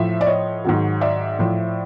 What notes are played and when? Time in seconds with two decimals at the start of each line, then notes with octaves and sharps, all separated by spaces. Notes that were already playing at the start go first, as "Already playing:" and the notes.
Already playing: A2 F3 E5
0.21 D5
0.26 C#5 D#5
0.64 G#2 D#3 F#3
1.01 D5 E5
1.39 A2 F3